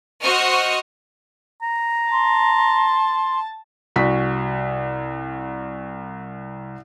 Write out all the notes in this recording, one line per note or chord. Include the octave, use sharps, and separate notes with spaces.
F#4 C5 D#5 C#6 D#6 F6
A#5
A5 C6
C2 F#4 B6